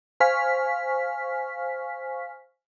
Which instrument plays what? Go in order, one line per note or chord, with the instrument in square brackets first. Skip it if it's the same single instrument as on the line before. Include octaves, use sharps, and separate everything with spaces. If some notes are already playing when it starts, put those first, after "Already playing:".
[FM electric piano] C5 F5 G#5 C#6 F6 B6